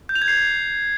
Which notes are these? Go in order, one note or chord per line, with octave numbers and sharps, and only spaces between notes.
G6
F7
G#6
C7